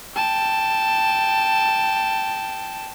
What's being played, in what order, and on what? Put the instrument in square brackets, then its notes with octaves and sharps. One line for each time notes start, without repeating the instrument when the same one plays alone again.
[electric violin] G5 A5